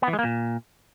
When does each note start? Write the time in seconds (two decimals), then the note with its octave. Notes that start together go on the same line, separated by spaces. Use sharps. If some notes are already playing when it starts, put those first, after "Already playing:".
0.02 B3
0.08 E3
0.13 G#3
0.19 A#3
0.24 A#2